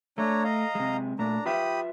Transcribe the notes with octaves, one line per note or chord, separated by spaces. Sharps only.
A3 D4 C#5 A#5
D#5 F5 A#5
C3 G#3
A#2 A3 D4 A#5
F4 G4 B4 E5 B5 D#6